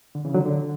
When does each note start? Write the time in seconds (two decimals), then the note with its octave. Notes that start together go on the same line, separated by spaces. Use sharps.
0.15 D3
0.25 C#3 E3
0.34 D3 F#3
0.46 D3